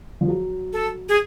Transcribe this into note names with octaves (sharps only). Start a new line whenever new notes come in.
F3
F#3
A4
G#4